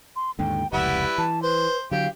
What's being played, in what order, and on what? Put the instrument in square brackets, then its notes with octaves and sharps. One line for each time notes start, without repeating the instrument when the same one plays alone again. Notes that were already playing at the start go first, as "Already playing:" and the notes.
[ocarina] C6
[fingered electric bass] D#2 G#2 D3 [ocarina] G5
[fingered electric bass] F1 C#2 [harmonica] G3 E4 B4 [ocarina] F#5
[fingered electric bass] E3 [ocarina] A5
[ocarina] B4 [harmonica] C5
[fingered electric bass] D3 F#3 [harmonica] G4 [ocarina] F5